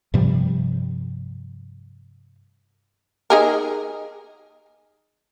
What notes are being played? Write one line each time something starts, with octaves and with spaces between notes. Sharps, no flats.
G2 C3 F3 G3
D#4 G#4 A#4